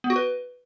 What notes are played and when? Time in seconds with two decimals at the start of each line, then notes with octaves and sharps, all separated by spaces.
0.04 B3
0.10 F#4
0.16 B4